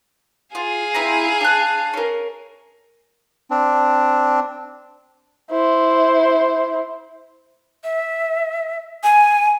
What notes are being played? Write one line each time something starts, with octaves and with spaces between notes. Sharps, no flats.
F4 G#4 F5
C4 E4 A#5
D4 F#6
C#4 A#4
C4 D4
E4 C5
E5
G#5